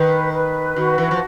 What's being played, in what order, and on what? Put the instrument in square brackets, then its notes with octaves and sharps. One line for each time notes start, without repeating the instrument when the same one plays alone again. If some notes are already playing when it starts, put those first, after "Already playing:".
Already playing: [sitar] D#3 [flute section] B4
[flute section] B4
[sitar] D#3 [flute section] F#4
[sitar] E3
F3